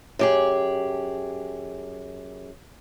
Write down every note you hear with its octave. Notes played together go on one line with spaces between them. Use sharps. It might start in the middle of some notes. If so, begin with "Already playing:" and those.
F#2 G4 G#4